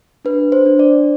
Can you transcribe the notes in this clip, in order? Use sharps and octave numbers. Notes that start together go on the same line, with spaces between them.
D4 B4
C5
D4
D5